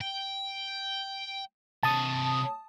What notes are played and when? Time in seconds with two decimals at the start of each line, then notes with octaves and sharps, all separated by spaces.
0.01 G5
1.83 C3 C#5 A5 D#6